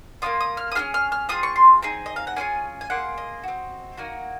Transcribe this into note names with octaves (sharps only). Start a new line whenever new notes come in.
A#3 C#4 F4 D#6
D#6
F6
D#6
C#4 F4 G#4 F6
F6
F6
C4 F4 G#4 D#6
C#6
C6
C4 D#4 G#4
D#5
F5
F#5
A#3 C#4 F4 G#4 G#5
G#5
A#3 F4 G#4 F#5
D#5
C4 F#4
A#3 D#4 F#4